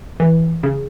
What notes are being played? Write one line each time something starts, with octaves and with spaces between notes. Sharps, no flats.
E3
C#3